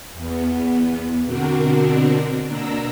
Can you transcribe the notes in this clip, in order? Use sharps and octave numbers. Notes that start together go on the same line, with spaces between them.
E2 B3
B2 D3 C4 D4 F#4 A#4
B2 A#3 D4 A#5 E6 A#6